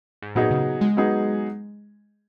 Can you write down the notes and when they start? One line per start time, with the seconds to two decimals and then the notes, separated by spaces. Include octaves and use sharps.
0.22 G#2
0.35 A#2 F#3 B3 D#4 G#4
0.51 C#3
0.81 G#3
0.97 F#3 B3 D#4 G#4